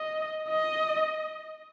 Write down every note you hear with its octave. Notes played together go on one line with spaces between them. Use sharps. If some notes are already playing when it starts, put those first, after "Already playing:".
Already playing: D#5
D#5